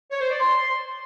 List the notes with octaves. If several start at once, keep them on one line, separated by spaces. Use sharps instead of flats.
C#5
C5
D5
C6